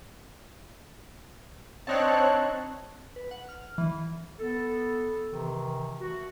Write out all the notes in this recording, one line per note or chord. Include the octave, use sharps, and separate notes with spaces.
C4 D4 D#4 C#5 A5 F#6
B4
F#5
F6
E3
B3 A4
C3 D#3 E3
A3 F#4